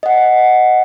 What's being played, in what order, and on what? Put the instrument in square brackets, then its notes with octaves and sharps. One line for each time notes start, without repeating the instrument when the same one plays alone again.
[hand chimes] D#5 F#5